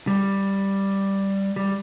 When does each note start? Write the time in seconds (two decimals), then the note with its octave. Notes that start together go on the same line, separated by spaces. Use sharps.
0.07 G3
1.56 G3